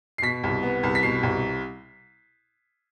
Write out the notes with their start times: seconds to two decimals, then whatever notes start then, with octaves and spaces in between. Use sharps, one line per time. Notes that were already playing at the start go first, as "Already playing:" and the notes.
0.18 C7
0.22 B2 B6
0.44 C2
0.63 B3
0.83 C2
0.95 B6
1.03 B2 C7
1.23 C2